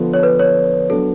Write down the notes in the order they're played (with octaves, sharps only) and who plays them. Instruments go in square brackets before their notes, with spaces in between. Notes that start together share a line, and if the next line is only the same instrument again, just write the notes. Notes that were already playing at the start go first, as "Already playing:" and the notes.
Already playing: [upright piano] D3 F3 B3 F4
[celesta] C#5
B4
C#5
[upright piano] F#3 B3 D4 F#4 [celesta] A4